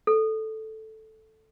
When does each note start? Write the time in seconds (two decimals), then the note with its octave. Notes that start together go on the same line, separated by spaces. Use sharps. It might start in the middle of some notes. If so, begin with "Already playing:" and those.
0.07 A4